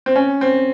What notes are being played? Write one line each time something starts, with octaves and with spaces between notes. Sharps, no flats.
C4
C#4
C4